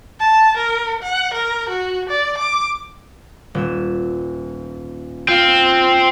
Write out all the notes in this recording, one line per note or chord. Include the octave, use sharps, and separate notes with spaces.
A5
A#4
F#5
A#4
F#4
D5
D6
D#1 E6
C4 F4 F5